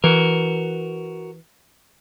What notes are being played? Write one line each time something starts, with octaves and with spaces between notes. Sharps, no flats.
E3 F#4 A#4